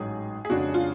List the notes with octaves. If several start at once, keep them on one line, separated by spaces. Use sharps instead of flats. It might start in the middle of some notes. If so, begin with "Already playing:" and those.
Already playing: A1 G#2 F#3 G#4
G#4
F2 C#3 G#3 D4 F#4
F4